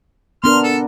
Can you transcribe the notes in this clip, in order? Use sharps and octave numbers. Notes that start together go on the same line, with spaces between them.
B3 D4 A#4 C6 F6
A4